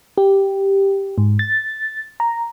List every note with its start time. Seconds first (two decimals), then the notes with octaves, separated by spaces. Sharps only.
0.18 G4
1.18 G#2
1.39 A6
2.20 A#5